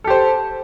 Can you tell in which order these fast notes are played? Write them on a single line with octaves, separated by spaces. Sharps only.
A4 G4 C5